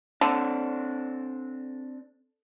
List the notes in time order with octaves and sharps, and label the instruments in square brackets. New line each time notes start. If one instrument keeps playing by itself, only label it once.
[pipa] D3 [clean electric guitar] C4 D4